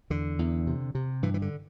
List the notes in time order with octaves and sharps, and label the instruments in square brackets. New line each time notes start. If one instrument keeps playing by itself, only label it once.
[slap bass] E2 D3
E2
C3
C3
G2 E3
E3
D3